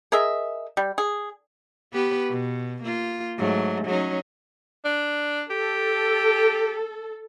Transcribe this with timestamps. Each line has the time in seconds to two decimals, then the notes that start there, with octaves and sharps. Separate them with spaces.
0.12 G#4 A#4 D#5 E5
0.77 G3
0.98 G#4
1.93 B3 G4 B4
2.30 B2
2.84 A#3 F4
3.38 G#2 F#3 A3
3.85 F#3 C#4 D#4
4.85 D4
5.50 G4 A4